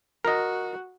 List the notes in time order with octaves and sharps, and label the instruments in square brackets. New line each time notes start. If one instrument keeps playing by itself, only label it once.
[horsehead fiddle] F#4 [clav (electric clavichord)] A#4 D#5